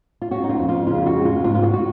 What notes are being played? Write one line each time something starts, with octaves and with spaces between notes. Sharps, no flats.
F4
C#4 F#4
D#4
F4
F2
F4
C#3 F4
F#4
G#3
F4
G#2 F4
F4
F#4
F#4